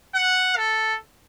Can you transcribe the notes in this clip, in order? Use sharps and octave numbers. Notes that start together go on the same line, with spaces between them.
F#5
A4